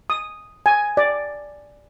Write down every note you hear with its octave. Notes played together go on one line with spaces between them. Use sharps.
D#6
G#5
D5